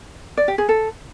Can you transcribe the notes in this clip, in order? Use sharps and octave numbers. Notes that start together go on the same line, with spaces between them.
D5
G4
G#4
A4